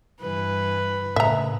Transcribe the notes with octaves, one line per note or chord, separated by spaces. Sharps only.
G2 E3 B4
A2 C#3 E5 A#5